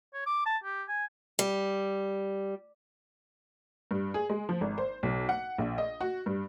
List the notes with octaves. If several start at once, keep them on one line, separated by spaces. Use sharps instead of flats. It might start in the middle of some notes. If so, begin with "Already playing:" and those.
C#5
D6
A5
G4
G#5
G3
G2
G#4
G#3
F3
G#1
C5
B1
F#5
A#1
D#5
F#4
G2